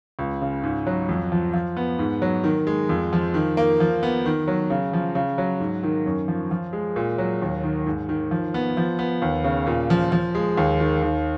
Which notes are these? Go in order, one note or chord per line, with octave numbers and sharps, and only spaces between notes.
C#2
C#3
G#2
F#3
F2
F3
F3
B3
G#2
F#3
D#3
G#3
F2
F3
D#3
A#3
F3
B3
D#3
F#3
C#3
F3
C#3
F#3
G#2
D#3
F#2
F3
F3
G#3
A#2
F#3
D#2
D#3
G#2
D#3
F3
B3
F3
B3
D#2
C#3
A#2
F3
F3
G#3
D#2
D#3
D#2